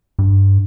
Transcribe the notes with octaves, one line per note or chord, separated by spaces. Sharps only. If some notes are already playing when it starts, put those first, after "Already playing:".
G2